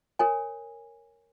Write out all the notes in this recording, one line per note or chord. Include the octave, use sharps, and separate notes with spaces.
A#4 C#5 G#5